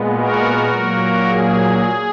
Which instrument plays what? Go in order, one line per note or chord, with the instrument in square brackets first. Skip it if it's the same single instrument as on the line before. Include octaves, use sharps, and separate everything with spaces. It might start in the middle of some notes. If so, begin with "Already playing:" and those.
Already playing: [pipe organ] A#2 G#3 B3
F#4 A#4
A#2 F#3 A#3
G#4